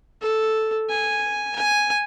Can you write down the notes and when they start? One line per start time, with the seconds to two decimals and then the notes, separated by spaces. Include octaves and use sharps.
0.21 A4
0.89 G#5
1.56 G#5